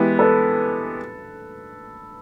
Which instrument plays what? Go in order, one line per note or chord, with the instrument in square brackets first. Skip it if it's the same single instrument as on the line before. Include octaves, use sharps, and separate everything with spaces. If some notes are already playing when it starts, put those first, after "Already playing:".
Already playing: [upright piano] E3 G#3 B3 E4 G4
[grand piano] A4 B4